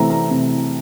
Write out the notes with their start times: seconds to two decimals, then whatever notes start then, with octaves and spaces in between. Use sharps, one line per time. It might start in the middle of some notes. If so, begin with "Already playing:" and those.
Already playing: C3 E3 A3 C4 A#5
0.10 A#5
0.31 C3